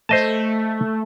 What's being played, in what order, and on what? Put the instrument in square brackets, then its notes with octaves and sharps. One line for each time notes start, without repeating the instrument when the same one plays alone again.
[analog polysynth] A3 [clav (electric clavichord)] C5 D#5 A5